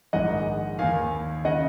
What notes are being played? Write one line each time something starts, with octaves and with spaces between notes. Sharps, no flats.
A#1 G#2 D#3 D#5 F#5
D#2 D#3 F5 G#5
C#3 D#5 F#5